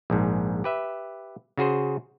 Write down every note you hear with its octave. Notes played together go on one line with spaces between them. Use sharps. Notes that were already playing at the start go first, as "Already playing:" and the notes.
A#1 G#2
G4 B4 E5
C#3 F#4 G#4 C5